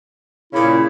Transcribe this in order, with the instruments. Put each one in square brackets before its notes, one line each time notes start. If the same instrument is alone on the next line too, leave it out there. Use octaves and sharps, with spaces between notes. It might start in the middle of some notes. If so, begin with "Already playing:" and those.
[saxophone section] A#2 C#3 [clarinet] E4